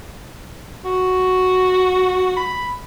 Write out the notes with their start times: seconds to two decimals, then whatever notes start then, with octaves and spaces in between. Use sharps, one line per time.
0.85 F#4
2.37 B5